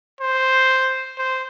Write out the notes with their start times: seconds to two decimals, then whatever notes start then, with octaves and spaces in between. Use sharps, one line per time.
0.21 C5
1.18 C5